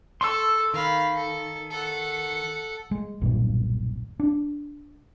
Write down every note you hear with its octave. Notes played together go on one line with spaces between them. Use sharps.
A4 C6 C#6 E6
D#3 F5 B5
A4
A4 F#5
G#3
D#1 B1 G2 A#2
D4